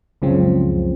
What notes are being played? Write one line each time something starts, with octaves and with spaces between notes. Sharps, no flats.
C#2 F#2 C#3 F3 C4